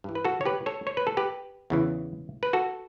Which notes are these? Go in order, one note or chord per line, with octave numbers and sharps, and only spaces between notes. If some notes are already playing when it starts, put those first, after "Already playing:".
G2 E3
B4
F#4 A4
C#5
G4 B4
A4 C#5
C#5
B4
A4
G4 B4
E2 C#3 E3
B4
F#4 A4